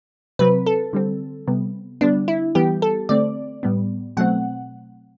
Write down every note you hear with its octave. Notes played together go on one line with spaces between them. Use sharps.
C3 F#3 C4 B4
A4
D3 G3 C4
C3 G3 B3
D3 G3 B3 D4
E4
E3 G3 B3 G4
A4
D3 A3 C4 D5
A2 G3 B3
B2 F#3 A3 C4 F#5